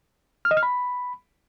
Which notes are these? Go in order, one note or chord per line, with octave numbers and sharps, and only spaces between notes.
F6
D#5
F6
B5